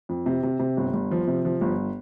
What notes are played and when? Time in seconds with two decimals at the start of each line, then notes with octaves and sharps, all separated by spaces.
0.09 F2
0.26 C3
0.43 C3
0.59 C3
0.77 G1
0.93 G1
1.11 F3
1.27 C3
1.45 F3
1.61 G1